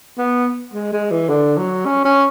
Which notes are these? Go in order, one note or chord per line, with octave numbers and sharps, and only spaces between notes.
B3
G#3
G#3
E3
D3
F#3
C#4
C#4